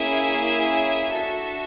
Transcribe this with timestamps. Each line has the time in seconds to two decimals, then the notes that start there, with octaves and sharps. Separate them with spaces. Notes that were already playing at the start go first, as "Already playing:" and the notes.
Already playing: A#3 C#4 E4 G#4 E5
1.13 D4 F#4 A4 E5